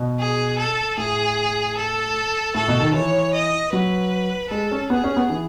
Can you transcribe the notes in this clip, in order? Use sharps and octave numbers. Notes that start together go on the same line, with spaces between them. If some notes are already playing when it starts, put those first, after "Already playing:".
Already playing: B2
G#4
A4
A2 G#4
A4
A2 A4
B2
D#3
E3 C#5
D#5
F#3 B4
G#3 A4
C#4
B3 G#4
C#4
B3
E3